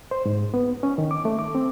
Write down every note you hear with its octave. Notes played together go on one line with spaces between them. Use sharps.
C5
G#2
B3
C#4
D#3
D6
A3
D6
C4